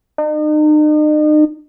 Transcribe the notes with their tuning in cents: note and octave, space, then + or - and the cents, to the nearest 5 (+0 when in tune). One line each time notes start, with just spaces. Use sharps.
D#4 -40